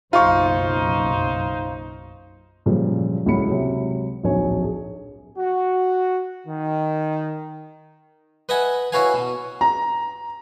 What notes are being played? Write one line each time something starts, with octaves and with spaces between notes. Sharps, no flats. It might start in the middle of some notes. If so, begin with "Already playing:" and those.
F#1 B1 F#2 D#4 F4 C5 C#6
F#2 A#2 C#3 F3 G3
D#1 C#2 A2 F#3 B5 C#7
C3 F#3 G#3
D1 A#1 D#4 C#5 G#5
G#4
F#4
D#3
B4 D#5 E5 F#5 G#5
C#4 E4 F#4 B4 F5 G#5
B2
A#5